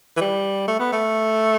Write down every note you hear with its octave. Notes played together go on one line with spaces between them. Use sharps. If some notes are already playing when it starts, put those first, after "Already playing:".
E3
G3
A3
B3
A3